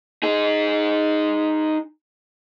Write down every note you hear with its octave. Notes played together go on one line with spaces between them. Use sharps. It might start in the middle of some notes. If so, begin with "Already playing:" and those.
D#4 G#4